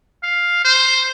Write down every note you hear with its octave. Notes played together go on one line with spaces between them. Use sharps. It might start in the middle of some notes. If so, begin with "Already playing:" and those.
F5
C5